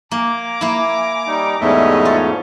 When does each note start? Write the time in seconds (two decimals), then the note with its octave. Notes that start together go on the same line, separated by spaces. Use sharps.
0.11 A#3 G#5 A#5 D6
0.61 A#3 E4
1.27 G3 D#4
1.61 E2 G#2 G3 A3 C#4 D#5 E5
2.05 F4